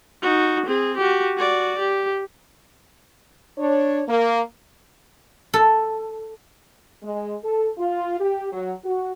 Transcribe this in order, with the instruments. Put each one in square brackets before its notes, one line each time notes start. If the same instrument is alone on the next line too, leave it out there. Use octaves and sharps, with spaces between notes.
[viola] D#4 F#4
C4 G#4
F#4 G4
F#4 D5
G4
[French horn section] D4 C#5
A#3
[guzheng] A4
[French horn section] G#3
A4
F4
G4
F#3
F#4